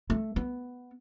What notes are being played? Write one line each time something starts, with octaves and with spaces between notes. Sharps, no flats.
A3
B3